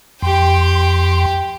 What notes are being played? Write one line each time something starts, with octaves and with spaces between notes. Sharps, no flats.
F2 G4 G5 C6